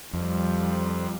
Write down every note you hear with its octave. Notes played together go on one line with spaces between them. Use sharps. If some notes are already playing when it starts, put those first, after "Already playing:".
F2 F3 G3